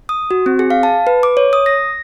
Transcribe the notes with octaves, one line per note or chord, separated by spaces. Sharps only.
D#6
F#4
C4
G#4
F5
A5
B4
D6
C#5
D#6
A#6